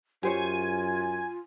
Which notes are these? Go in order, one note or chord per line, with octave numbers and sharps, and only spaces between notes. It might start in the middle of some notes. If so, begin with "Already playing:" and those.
F#2 F4 G4 C5 C#5 G#5